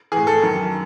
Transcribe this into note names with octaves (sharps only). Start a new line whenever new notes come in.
A2 E3 G#4
A4
F#2 D#3